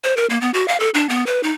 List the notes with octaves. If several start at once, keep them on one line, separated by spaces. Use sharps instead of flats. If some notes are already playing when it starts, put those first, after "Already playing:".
C5
A#4
A#3
B3
F#4
F5
A4
D4
B3
B4
D#4